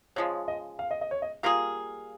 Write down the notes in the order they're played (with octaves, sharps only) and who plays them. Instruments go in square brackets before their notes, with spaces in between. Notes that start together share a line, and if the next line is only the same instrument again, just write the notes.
[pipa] C#3 F3 G#3 [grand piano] C#5
[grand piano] D#5
F5
D#5
D#5
C#5
D#5
[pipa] G3 A#3 F4 G#4 [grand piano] F5